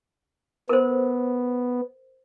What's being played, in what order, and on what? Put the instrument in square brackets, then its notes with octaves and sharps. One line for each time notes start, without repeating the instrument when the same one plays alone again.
[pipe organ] B3 [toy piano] A#4 C5